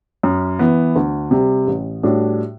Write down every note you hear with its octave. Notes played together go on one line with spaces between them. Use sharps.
F#2
E3 B3
D2
C3 G3
A1
A2 G3 D4 F#4